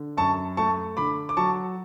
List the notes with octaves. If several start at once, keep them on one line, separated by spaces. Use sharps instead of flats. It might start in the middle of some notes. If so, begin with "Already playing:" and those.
Already playing: D3
F#2 A5 C#6
A3 A5 C#6
D3 B5 D6
D6
F#3 A5 C#6